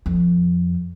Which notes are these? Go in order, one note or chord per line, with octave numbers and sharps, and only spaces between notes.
F2